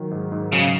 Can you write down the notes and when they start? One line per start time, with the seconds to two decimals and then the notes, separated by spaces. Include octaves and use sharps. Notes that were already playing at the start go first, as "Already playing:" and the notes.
Already playing: D#3 F#3
0.11 G#2
0.32 G#2
0.52 C#3 F#3